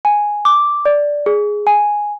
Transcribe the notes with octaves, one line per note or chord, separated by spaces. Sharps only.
G#5
D6
D5
G#4
G#5